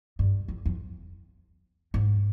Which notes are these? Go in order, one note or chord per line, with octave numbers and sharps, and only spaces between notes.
G2
F2
F2
G#2